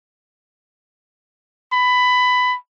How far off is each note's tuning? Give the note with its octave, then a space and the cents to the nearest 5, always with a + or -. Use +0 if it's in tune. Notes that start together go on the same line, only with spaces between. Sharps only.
B5 +15